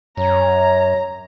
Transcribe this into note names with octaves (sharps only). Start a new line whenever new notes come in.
F#2 C#5 A#5